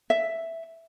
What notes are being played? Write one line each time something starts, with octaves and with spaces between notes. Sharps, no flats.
E5